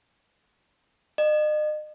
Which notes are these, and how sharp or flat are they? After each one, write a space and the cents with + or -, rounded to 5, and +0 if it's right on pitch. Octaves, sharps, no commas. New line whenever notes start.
D#5 -40